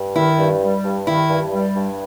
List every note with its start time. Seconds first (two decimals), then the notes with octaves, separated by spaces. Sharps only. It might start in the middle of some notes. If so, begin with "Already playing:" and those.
Already playing: G2
0.16 D#3 E4
0.38 G2
0.61 G3
0.85 G2
1.06 D#3 E4
1.29 G2
1.51 G3
1.75 G2